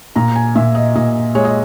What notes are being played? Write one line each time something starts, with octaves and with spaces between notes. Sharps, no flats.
A#2 A#5
G#5
A#2 E5
D#5
A#2 D#5
G#3 C#5
D#5